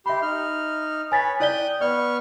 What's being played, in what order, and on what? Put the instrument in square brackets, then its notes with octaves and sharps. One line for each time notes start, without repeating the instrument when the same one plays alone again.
[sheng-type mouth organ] G4 C6 [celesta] E5 B5
[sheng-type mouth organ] D#4 F6
[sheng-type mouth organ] B4 C#5 [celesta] G#5 A6 B6
[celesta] E4 D5 G7 [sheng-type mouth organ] G5 D#6 F#6
[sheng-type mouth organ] B3 C#6 F6 [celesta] D5